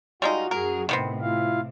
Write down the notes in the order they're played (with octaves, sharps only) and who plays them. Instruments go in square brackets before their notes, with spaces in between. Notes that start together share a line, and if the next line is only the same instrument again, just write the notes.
[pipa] G3 G#3 D#4 [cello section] F4 [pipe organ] F#4
[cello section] F#2 G#4 [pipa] A#4
[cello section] A2 C3 [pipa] D#3 B3 C4
[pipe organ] E4 F4 F5